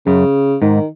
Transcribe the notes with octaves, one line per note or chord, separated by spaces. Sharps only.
F#2 C#3
G#2 D#3